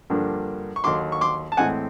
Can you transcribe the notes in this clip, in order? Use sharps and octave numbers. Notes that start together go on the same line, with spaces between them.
G2 D3 F3 A#3 D4
C#6
D#2 D3 F#3 C6 D6
C#6
C6 D6
A5
A2 E3 G#3 C4 F#5 G#5